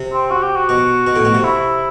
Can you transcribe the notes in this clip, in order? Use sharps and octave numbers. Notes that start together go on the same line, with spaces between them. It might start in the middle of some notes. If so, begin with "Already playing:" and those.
Already playing: C3
C4
F#4
G4
F#4
B2
B2
A2
B2
C3
E4